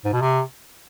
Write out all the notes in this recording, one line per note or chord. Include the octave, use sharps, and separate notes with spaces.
G#2
B2
C3